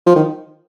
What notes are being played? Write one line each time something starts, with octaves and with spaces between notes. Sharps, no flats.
F3
D#3